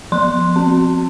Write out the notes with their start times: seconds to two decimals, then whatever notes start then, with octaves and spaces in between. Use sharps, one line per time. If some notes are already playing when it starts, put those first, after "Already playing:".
0.12 F3 C6
0.56 C4